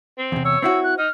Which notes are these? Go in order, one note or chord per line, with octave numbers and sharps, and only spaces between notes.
C4
E2 C3
C#5 E6
C4 E4 F#4 E6
F#6
D#4 F6